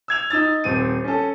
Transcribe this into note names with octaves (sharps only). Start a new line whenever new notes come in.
E6 G#6 F7
D#4 E6 A6
D#1 C4 D#7
C#4 A4